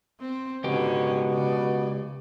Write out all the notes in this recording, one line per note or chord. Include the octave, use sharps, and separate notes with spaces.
C4
C#2 G#2 B2 D3 C#4 G4
C#3 D5